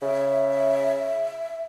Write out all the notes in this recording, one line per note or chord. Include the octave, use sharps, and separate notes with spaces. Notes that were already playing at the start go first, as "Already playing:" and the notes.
C#3 E5